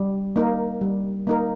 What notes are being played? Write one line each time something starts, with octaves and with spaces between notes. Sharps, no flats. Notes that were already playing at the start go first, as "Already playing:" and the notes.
Already playing: G3
A#3 D#4 A#4
G3
A#3 D#4 A#4